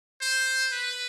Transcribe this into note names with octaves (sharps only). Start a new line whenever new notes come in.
C5
B4